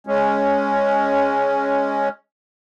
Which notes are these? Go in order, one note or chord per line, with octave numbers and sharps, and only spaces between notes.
G#3 C#4